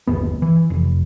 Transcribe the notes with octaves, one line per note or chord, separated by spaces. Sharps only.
G1 D#2 B3
E3
F1